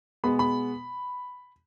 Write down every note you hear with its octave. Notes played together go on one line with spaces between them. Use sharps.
B2 G#3 B3 B5
B5